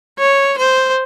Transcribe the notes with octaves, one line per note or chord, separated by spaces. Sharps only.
C#5
C5